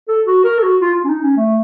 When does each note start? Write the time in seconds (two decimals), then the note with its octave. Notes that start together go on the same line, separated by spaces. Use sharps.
0.08 A4
0.27 F#4
0.45 A#4
0.58 A4
0.63 F#4
0.81 F4
0.95 F4
1.05 C#4
1.09 D#4
1.22 C#4
1.37 A3